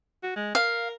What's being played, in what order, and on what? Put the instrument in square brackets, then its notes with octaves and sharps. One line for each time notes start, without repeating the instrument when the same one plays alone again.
[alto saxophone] F#4
G#3
[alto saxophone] A#4 [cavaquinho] F5